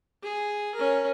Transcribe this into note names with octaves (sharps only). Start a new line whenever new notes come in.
G#4
C#4 A#4